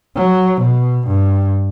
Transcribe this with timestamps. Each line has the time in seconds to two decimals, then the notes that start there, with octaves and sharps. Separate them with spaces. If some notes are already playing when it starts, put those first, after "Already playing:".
0.16 F#3
0.61 B2
1.07 G2